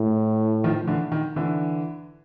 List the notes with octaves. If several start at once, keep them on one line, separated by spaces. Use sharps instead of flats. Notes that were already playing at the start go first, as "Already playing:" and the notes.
Already playing: A2
D#3 F3
D3 E3
D#3
D3 E3